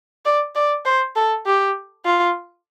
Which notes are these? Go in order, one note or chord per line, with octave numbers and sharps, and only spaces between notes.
D5
D5
C5
A4
G4
F4